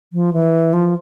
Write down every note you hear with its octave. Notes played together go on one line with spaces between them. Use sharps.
F3
E3
F3